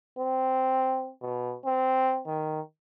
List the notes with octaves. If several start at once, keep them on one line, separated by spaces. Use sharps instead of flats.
C4
B2
C4
D#3